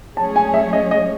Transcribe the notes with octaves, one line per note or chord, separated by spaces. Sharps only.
F#3 A3 C#4 G#4 C#5 A5
G#5
E5
D#5
D#5